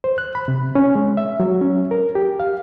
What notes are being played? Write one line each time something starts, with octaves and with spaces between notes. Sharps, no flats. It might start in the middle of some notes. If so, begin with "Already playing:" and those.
C5
F#6
B5
C3
C#4
G#3
E5
F#3
C#4
A#4
G4
F5